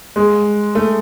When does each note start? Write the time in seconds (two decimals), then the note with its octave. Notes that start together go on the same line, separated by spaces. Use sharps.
0.16 G#3
0.75 A3